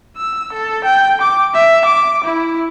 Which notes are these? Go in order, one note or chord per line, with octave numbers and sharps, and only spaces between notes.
E6
A4
G5
D6
E5
D6
E4